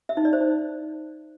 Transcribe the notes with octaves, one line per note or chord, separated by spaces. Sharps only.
E5
D#4
D5
C5
D#4